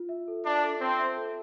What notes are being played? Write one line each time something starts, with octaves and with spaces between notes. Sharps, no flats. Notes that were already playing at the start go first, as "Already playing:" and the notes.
Already playing: F4
E5
A4
D4 E5
A4
C4 A5
E5
A4